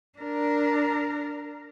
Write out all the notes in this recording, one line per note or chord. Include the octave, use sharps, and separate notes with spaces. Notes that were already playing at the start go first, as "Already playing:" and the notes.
D4 A#4